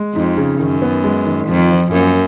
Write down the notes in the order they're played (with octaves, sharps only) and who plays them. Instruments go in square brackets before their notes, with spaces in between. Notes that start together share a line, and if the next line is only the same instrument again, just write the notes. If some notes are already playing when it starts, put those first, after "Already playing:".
Already playing: [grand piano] G#3
[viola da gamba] F2 [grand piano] D#4
[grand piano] C#3
[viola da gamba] F#2 [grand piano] D#3
[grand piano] B3
G#3
D#3
[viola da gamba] F2 [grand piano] F3
[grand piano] F3
[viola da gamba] F#2 [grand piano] A#3